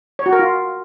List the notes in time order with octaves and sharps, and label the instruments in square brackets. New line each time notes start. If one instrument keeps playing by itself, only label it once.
[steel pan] C#5
F#4
A#4
F4